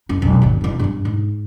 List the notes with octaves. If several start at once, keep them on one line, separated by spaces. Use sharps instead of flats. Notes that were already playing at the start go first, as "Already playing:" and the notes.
F#1 E4
E1 B1
G#1 D#2
E1 E2
G2 B3
G#2